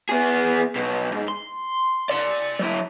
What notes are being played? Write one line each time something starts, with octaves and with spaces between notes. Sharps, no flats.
B3 G#4
B1 B2
G#2
C6
D5 C6
F#3 E4